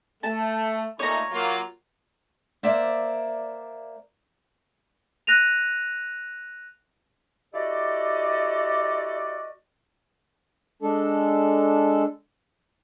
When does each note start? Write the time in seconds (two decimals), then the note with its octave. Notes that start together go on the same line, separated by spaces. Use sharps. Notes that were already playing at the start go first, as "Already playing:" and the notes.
0.23 A3 A5
0.99 A#2 A3 D#4 C#5 A#5
1.31 F#3 A#3 F4
2.63 A#3 C5 D5 E5
5.27 F#6 A#6 D#7 F7
7.54 E4 F#4 G4 A4 D5 D#5
10.82 G#3 D4 A4